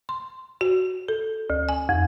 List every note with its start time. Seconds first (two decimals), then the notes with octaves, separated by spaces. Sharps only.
0.09 C6
0.61 F#4
1.08 A4
1.50 D2
1.69 G#5
1.89 F2